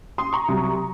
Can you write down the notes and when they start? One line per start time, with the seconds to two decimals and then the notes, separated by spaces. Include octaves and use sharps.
0.18 C6 D#6
0.33 A#5 C#6
0.48 C2 C3 F#3